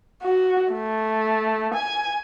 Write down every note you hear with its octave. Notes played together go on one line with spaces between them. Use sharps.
F#4
A3
G#5